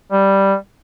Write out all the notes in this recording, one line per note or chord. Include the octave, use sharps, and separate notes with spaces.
G3